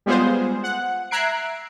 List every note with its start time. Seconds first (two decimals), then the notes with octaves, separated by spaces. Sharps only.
0.06 G3 G#3 B3 F4 G#4 C5
0.63 F#5
1.11 E5 A#5 F#6 G#6 C7 D7